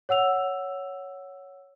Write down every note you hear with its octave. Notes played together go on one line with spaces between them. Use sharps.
C#5 F#5 E6 F7